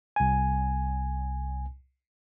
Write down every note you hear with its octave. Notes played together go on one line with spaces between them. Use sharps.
C2 G#5